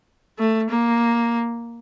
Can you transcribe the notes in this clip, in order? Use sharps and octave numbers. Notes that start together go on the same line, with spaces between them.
A3
A#3